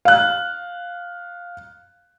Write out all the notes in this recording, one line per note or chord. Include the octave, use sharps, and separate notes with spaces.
F5 F#6